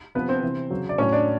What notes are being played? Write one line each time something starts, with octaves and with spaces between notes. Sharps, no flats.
C3 F3 B3 B4
C4 C5
C3 E3
C#3 F#3
D5
A2 F#3 C#4 C#5
D4 D5